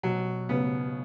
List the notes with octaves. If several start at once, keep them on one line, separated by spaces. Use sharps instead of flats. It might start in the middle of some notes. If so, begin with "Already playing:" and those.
B2 F#3
C#3 B3